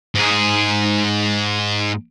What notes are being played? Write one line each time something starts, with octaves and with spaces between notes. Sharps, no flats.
G#2 G#4